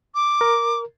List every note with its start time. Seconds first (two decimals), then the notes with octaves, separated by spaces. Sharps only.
0.15 D6
0.41 A#4